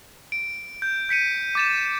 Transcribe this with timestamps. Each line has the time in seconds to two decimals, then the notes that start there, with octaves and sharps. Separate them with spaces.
0.32 D7
0.82 G6
1.09 G6 B6 C#7 D#7
1.55 D6 A6 E7